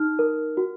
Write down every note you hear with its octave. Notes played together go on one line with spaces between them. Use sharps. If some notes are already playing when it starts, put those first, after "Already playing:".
Already playing: D#4 F6
A#4
F#4